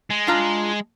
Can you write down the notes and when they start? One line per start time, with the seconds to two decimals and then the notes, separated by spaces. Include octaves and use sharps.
0.10 G#3
0.27 D4 F4 A#5